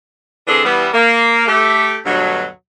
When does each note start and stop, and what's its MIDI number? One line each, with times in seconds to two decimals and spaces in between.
0.47 0.61 50
0.47 0.61 52
0.47 0.61 60
0.47 0.61 62
0.47 0.61 68
0.47 0.61 69
0.65 0.89 52
0.65 0.89 55
0.65 0.89 59
0.93 1.47 58
1.47 1.97 57
1.47 1.97 67
2.05 2.46 38
2.05 2.46 43
2.05 2.46 47
2.05 2.46 54